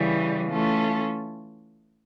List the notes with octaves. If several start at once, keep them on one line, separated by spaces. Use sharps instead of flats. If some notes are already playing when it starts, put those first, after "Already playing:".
Already playing: C#3 E3 G3
E3 A3 C#4 F4 A4